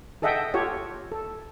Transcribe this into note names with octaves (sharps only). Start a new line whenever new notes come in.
G#4 A4 D#5 E5 F#5 G5
F4 G4 A4 C#5 F#5 G5
A4